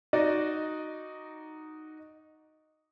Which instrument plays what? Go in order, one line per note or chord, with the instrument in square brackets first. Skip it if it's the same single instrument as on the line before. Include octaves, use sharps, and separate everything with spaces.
[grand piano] D#4 F#4 D5 D#5